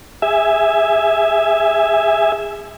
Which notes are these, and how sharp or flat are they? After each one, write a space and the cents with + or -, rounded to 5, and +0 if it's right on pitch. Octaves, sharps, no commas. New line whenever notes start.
G#4 -25 E5 +0 G#5 +5